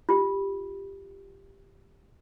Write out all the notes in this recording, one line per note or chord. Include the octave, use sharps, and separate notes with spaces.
F4 G4